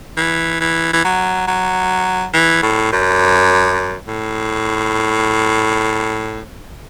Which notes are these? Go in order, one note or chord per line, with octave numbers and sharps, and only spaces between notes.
E3
E3
E3
F#3
F#3
E3
A2
F#2
A2